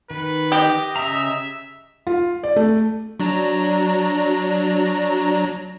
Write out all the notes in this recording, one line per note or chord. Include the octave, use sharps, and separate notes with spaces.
D#3 B4
G4 D#5
C#3 E5 A#5
F4
D5
A3
F#3 D4 A#5